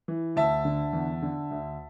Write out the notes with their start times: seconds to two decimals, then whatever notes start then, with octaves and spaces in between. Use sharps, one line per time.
0.08 E3
0.36 D2 E5 A5
0.65 D3
0.93 E2
1.22 D3
1.51 D2